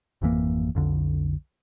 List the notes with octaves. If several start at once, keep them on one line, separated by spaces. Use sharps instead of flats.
G#1 F2 E3 A#3
B1 F2 D3